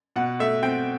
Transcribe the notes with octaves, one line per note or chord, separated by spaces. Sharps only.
B2 F#5
A3 E5
C4 G5